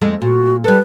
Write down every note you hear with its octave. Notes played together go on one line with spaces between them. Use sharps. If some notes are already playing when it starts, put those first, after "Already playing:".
F2 G#3 A3
A#2 F#4
G3 A4 B4